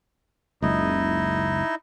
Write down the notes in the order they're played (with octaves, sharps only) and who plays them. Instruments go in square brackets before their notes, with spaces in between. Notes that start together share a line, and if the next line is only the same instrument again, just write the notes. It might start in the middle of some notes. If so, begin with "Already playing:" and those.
[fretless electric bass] F#1 C#2 [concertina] D#4 E4 D#5